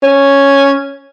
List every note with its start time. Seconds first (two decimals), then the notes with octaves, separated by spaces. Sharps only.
0.03 C#4